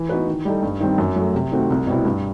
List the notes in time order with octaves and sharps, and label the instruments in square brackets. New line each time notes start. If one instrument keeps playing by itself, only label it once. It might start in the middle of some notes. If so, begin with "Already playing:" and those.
Already playing: [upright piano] E3
B3 D#4 F#4 B4
D#3
G3 D#4 A4
G2
D#3 G3 C4
F#2
F#3 A3
C3
D#3 A3 C4 F#4
C2
B2 G3 C4 E4
G2